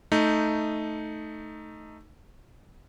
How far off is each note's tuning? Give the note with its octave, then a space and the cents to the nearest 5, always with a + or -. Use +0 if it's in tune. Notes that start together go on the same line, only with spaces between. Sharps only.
A3 +0 D#4 +0